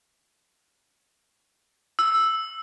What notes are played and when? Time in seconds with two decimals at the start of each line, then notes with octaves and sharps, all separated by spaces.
1.99 E6